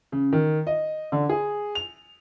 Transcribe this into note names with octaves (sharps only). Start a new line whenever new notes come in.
C#3
D#3
D#5
D3
G#4
F7